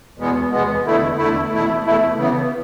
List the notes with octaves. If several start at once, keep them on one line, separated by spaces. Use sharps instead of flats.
E2 B2 G#3 B3
E2 B2 G#3 B3
E2 D3 A3 E4
E2 D3 A3 E4
E2 B2 A3 E4
E2 B2 A3 E4
C#3 E3 B3